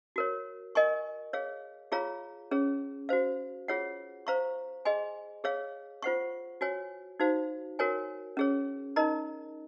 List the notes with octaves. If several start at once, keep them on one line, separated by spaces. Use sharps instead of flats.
F#4 A#4 C#5
A#4 D#5 G#5 C#6
G#4 C#5 F5
F4 G#4 C#5 F5 A#5
C#4 G#4 C#5
F#4 C5 F5
F4 G#4 C#5 F#5
C5 F5 A#5 C#6
G#4 D#5 G#5 C6
G#4 C#5 F5
F4 C5 F#5 C#6
F#4 C#5 G#5
D#4 F#4 C5 F5
F#4 A#4 C#5 G#5
C#4 G#4 C#5
D#4 A#4 D#5 A#5